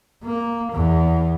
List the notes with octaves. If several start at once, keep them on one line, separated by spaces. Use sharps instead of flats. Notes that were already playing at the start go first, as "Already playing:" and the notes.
A#3
E2